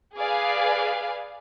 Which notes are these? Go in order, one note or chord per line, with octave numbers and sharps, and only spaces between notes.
G#4 B4 D5 F5 G#5